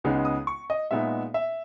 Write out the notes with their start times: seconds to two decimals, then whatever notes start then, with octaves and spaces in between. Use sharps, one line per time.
0.04 C#2 C#3 G#3 B3 D#4
0.25 D#6
0.47 C#6
0.70 D#5
0.91 A#2 G#3 B3 D#4 E5
1.34 E5